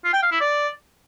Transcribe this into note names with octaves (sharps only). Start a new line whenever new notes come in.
F4
G5
F5
E4
D5